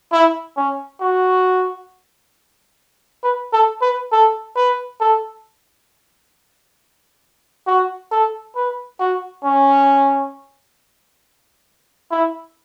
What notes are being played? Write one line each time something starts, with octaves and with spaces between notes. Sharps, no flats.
E4
C#4
F#4
B4
A4
B4
A4
B4
A4
F#4
A4
B4
F#4
C#4
E4